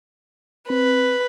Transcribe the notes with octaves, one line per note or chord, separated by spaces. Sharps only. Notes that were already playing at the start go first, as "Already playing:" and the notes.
C4 B4